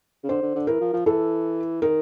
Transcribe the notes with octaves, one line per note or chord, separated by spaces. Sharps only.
C#3
D3 C5
D3
D3
E3 A#4
F3
F3
E3 A4
D#3 A#4